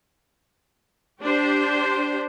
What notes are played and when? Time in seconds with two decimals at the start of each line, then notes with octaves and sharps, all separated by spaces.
1.22 D4 G4 C5